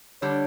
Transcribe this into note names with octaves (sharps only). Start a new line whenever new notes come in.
D3 G3 D4 C#5